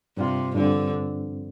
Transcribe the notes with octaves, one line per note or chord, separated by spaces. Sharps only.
G2 C3 G3 F4
G2 D3 F3 C4